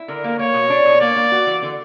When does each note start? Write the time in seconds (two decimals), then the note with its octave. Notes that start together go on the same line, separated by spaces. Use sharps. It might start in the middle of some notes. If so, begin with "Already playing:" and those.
Already playing: E4
0.08 D3 A#4
0.24 A#3
0.39 A#3 C#5
0.54 B2
0.70 D4
0.85 B2
1.01 A#3 D5
1.16 A#3
1.32 F#4
1.46 E3
1.62 D3